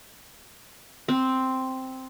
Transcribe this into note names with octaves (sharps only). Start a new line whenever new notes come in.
C4